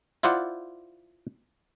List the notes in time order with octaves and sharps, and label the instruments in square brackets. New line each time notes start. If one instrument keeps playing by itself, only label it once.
[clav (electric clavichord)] E4 F4 C5 D5 F#5